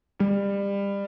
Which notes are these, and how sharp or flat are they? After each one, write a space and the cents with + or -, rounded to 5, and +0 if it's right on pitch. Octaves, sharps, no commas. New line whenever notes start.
G3 +30